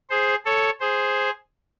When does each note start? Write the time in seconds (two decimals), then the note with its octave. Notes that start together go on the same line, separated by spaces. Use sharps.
0.10 G#4 C5
0.45 A4 C#5
0.80 G#4 C5